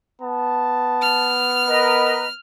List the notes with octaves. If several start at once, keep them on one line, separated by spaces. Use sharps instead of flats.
B3 A5
F6
A#4 B4 D#5 A#5